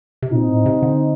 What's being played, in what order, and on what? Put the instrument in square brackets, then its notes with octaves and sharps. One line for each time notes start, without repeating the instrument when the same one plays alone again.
[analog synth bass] C3
[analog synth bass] A#2 [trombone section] C4 D#4
[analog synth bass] A2
C3
D3